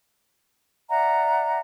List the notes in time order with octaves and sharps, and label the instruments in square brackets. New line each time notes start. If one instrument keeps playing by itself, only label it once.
[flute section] D5 E5 F#5 A#5